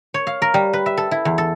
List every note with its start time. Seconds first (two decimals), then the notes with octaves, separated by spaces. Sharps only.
0.14 C#5
0.27 F5
0.42 A#4
0.54 G3
0.73 B4
0.86 E5
0.97 A4
1.11 E4
1.25 E2
1.38 A4